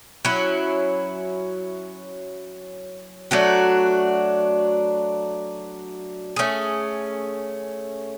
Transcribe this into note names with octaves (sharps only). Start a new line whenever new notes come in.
F#3 C#4 E4
F#3 A3 D4 F#4
A3 C#4 G#4